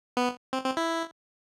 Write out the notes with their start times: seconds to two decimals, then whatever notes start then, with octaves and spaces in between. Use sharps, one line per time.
0.17 B3
0.53 C4
0.65 C4
0.77 E4